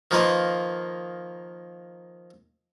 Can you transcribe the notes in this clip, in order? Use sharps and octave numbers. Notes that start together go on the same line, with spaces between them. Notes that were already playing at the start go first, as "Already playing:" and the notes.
D#3 F3 A#3 B4 D#5